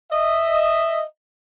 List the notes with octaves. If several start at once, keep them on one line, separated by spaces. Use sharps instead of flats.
D#5 E5